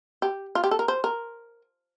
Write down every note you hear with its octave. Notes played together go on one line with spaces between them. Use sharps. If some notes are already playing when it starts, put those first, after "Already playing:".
G4
F4
G4
A4
A#4
C5
A#4